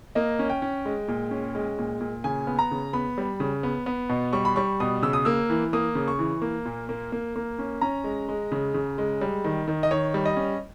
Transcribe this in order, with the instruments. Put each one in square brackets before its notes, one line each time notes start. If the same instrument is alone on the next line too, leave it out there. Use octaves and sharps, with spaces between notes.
[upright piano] A#3 D#5
C#4
G5
C#4
G#3
A#2
C#4
G#3
A#2
A#2
C#3 G#5
B3
A#5
C#3
B3 B5
G3
C#3
B3
B3
B2
G3 C#6
B5
G3 C#6
B2 D#6
C#3 E6
D#6
A#3 E6
E3
A#3 D#6
C#3
C#6
E3
A#3
A#2
A#3
A#3
A#3
C#4
C#4 A#5
G#3
G#3
C#3
C#3
G#3
G3
D#3
D#3
D#5
D#3 C#5
G3
D#5
C#4